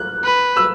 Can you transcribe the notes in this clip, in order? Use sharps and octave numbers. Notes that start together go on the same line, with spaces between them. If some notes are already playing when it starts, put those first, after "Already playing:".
Already playing: F#6
B4
E6